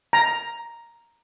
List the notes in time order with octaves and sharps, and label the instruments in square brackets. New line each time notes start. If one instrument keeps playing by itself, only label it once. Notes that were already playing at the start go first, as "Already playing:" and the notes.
[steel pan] A#5